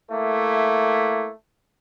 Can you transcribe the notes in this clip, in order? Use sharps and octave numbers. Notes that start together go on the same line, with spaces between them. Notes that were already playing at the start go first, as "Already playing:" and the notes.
A3 A#3 E4